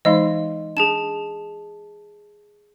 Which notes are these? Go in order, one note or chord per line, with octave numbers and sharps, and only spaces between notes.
E3 G#3 D#4 D#5 F5 C6
D4 G#4 A5 E7